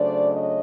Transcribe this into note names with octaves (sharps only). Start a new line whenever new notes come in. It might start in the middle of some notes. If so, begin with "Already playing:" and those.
Already playing: C#3 F#3 A3 D4 C5 D5
C#5 D#5